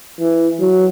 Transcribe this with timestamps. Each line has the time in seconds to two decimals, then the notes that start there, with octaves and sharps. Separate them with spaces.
0.20 E3
0.59 F#3